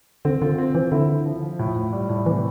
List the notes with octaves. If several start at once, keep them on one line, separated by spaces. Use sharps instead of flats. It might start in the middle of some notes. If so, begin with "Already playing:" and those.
D3 C4
D3 F4
C4
E3 C4
D3 E4
E4
F3
F3
A2
A2
G3
A2
C3 E3